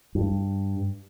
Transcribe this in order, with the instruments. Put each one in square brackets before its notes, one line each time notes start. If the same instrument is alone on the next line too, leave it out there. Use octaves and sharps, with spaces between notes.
[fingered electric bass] G2